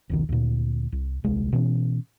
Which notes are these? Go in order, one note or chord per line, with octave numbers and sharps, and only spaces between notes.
E1 C2 D#3
D2 A#2
C2
D#1 C2 G#3
B2 E3 C#4